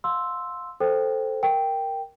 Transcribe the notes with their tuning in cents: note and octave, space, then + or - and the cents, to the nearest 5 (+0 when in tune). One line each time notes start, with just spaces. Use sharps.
F5 +30 C6 +0 E6 +0
A4 +0 C5 +0 G5 +0
A#4 +0 G5 +0